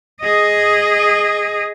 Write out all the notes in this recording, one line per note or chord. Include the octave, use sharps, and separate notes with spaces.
G#4 D#5